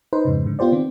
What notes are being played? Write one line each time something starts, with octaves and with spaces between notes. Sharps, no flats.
D#4 B4 C5
F2 G#2 C#3
G#2 D3
B3 F4 G4 C5 D5
D#3 C4